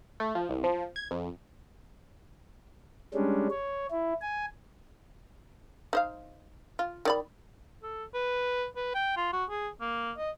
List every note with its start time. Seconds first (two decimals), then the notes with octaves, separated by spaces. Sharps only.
0.20 A3
0.35 F3
0.49 C2
0.64 F3
0.96 G#6
1.11 F2
3.14 G3 G#3 C#4 D4
3.50 C#5
3.91 E4
4.21 G#5
5.93 D#4 C5 F5
6.79 F4
7.05 D#3 D5 B5
7.83 A4
8.14 B4
8.76 B4
8.95 G5
9.17 F4
9.33 F#4
9.50 G#4
9.81 A#3
10.17 D#5